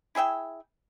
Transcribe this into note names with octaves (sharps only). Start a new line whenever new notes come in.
E4 G#4 E5 G5